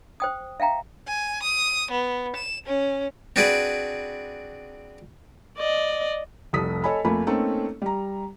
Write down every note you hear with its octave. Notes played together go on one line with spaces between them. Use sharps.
C5 G5 D#6
E5 F5 G5 A#5
G#5
D#6
B3
E7
C#4
C4 D4 F#4 G#4 B4 D5
D5 D#5
F1 C2 A4 D#6 B6
A4 C#5 D#5 G#5 B5
F2 A3 A#3 G#5 B5
A3 A#3 C4 C#4 D#4 A4
G3 A#5